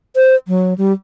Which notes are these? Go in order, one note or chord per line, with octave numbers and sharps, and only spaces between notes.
C5
F#3
G3